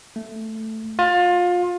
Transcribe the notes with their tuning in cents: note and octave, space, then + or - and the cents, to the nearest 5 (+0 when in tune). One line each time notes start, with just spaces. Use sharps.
A3 +5
F4 +25